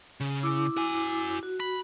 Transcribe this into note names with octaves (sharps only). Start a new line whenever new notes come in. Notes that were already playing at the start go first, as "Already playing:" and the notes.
C#3
E4 D6 E6
F#4 G#5
F#4
B5